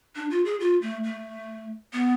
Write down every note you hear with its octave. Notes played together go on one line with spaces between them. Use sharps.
D4
F4
G#4
F4
A3
A3
B3